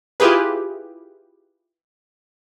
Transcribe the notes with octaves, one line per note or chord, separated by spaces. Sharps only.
E4 F4 G4 G#4 B4